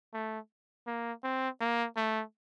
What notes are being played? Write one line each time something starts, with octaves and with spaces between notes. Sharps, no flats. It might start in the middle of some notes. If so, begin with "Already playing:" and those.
A3
A#3
C4
A#3
A3